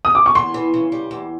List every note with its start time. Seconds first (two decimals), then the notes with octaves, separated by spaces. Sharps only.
0.05 D#6
0.15 D6
0.26 C#6
0.35 E2 C6
0.54 E3
0.74 C#3
0.92 G3
1.11 E2